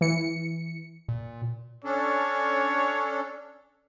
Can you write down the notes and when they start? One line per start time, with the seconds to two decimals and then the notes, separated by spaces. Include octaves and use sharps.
0.01 E3 C#7
1.09 A#2
1.84 C#4 D4 A4 C#5